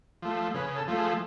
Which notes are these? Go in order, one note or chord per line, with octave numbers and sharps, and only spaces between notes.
F3 A3
C#3 B4
A4
F3 A3
G#4